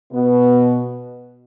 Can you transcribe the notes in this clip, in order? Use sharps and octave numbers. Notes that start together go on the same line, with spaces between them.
B2 B3